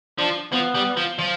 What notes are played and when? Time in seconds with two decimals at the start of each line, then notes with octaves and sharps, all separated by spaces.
0.18 F3 D4
0.52 F3 B3
0.75 G3
0.97 F3
1.19 F3